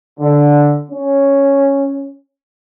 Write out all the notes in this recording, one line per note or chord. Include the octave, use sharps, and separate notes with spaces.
D3
C#4